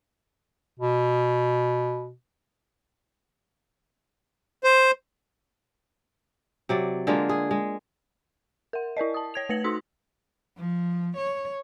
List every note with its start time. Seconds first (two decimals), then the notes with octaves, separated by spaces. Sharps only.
0.79 B2
4.64 C5
6.69 C3 F#3 D5
7.07 D3 G#3 A#3 F4
7.29 G#4
7.51 G#3
8.73 A#4 F#5
8.97 E4 A#4 D5 D#5
9.14 A5 D#6
9.34 C#5 G#6 F7
9.49 A3 B4 A#6 C#7 F#7
9.64 D#4 F#4 C6 E6 B6
10.58 F3
11.17 C#5